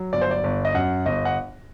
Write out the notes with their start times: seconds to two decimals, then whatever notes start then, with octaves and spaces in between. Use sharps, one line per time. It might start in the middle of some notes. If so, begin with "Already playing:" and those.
Already playing: F#3
0.13 G1 D5
0.21 C5
0.31 D5
0.44 G1
0.65 D#5
0.74 F#2 F#5
1.06 G1 D#5
1.25 F#5